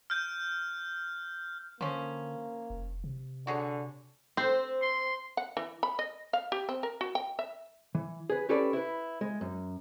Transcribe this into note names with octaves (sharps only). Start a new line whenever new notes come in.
F6 G6
D3 F3 A#3 C#4
F1
C3
D3 F#4 G#4 C#5
C4 C5
C6
F#5
E3
B5
D#5
F5
G4
C4
A#4
F#4
G5
E5
E3
G#4 B4
C#4 G4 A4 B4 D5
E4 B4
G#3
F#2